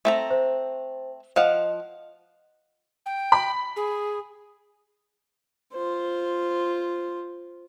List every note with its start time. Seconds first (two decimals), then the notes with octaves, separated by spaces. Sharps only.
0.05 A3 C4 A#5
0.30 C5
1.36 F3 D#5 F5 F#5
3.06 G5
3.32 B5
3.76 G#4
5.73 F4 C5